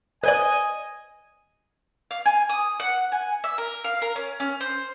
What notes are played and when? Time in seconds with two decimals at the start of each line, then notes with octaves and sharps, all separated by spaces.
0.24 B4 C5 D5 D#5 G#5
2.11 F5
2.26 G#5
2.49 D#6
2.80 F#5
3.12 G#5
3.44 E5
3.58 A#4
3.84 F5
4.02 A#4
4.16 C#4
4.40 C#4
4.60 C5